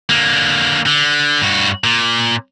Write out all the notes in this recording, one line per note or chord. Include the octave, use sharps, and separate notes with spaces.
D3 A#3
D3
G2 F#4
A#2